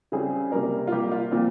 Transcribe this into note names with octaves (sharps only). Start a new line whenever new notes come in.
C#3 G3 C4 G#4
C3 G3 A#3 A#4
F4
C3 G3 A#3 G4
F4
A#2 F3 C4